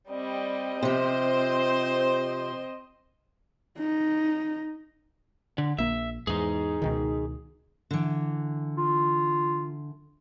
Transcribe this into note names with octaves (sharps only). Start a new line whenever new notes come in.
G3 C4 D#5
C3 F3 C5
D#4
D3
A#1 A#3 E5
E2 G#2 D#4 G#4
C#2 B2 D#3
D3 E3
F4